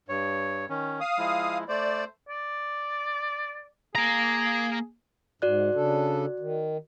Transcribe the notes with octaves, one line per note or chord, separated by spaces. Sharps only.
G2 C#5
D#3 C#4
F5 D#6
F3 G#3 E4
A3 C5 D5
D5
A#3 G#4 A#5
G#2 F#4 D5 F#6
C#3 D4 A4
D#3